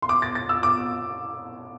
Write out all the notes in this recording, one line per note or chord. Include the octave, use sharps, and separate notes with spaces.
C6
D6
A6
A6
E6
D6